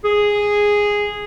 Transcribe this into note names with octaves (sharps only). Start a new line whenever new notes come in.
G#4